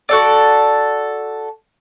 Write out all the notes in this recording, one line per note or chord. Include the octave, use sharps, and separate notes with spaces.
F#4 A4 D5